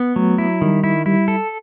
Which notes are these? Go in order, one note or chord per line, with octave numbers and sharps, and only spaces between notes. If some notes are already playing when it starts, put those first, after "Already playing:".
Already playing: B3
F#3 A3
E4
D#3 G3
E4
G3 E4
A4